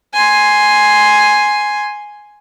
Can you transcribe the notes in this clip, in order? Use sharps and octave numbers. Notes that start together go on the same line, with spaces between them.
G#5 C6